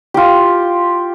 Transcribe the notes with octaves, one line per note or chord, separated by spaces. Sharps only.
F4 G4